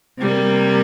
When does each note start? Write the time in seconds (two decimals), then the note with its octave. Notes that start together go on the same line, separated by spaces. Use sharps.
0.20 C3 G3 A#3